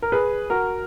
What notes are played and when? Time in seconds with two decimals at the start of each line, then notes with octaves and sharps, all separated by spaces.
0.02 A#4
0.12 G#4 B4
0.50 F#4 A#4